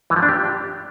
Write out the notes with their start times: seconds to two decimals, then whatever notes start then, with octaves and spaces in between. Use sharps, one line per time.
0.10 E3
0.16 F3
0.22 D4
0.28 G4